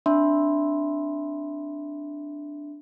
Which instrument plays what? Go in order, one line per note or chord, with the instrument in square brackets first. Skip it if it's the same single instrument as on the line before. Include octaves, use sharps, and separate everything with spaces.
[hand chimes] C4 D4 E5 B5 C6